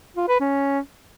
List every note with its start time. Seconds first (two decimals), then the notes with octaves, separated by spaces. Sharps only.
0.17 F4
0.28 B4
0.40 C#4